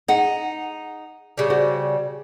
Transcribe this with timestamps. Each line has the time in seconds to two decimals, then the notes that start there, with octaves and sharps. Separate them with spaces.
0.08 D#4 G#4 F#5
1.38 C#3 G3
1.50 F#4 C5 D5